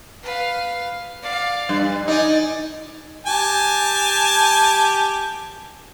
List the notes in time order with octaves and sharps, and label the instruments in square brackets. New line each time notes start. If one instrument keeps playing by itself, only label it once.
[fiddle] B4 F5
D5 F5
[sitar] G2
[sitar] D#4 [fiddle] D5 G#5
[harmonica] G4 G#5 A5